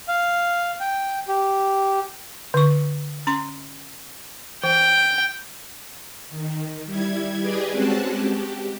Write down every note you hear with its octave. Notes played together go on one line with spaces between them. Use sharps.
F5
G5
G4
D3 C#6
C#4 A#5 C6
E3 G5
D#3
G3 E4 G#6
G4 G#4 B4 D5 D#5
G#3 C4 C#4 F#4 A5 F#6
G4